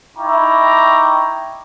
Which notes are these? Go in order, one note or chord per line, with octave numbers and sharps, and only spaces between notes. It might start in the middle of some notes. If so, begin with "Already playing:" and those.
D#4 E4 G5 A#5 C#6 D6